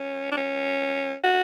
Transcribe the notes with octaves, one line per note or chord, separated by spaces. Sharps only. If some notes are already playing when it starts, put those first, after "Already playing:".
Already playing: C#4
D4
C#4
F#4